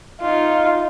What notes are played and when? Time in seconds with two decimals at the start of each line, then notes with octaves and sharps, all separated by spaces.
0.21 D#4 F4